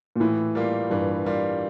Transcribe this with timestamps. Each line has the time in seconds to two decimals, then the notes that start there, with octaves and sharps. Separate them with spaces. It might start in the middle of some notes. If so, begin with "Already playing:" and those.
0.16 A#2
0.20 A2 E3
0.55 G3 A#3 F4
0.90 G2 E3
1.26 G3 A#3 F4